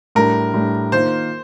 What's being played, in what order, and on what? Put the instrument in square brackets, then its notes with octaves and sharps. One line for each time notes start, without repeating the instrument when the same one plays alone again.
[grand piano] A2 G3 D4 [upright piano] A#4
[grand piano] A2 G3 D4
[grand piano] D#3 A#3 F4 A#4 [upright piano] C5